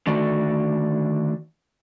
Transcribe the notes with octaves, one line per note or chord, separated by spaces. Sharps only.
D3 D#3 A3 F#4 A4 D5